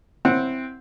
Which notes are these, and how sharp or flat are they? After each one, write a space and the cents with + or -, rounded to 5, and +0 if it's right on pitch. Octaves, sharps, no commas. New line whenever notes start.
C4 +0 E4 +0 F#5 -10